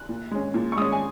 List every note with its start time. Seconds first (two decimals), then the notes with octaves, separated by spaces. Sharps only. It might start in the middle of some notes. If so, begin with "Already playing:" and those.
Already playing: F#6
0.09 A#2
0.31 G#3 C#4
0.54 A#2
0.72 C#6
0.77 G#3 C#4 D#6
0.92 G#5